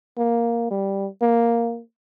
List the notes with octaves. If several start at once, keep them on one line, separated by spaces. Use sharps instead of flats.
A#3
G3
A#3